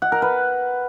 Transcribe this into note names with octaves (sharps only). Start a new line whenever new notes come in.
F#5
A#4
B4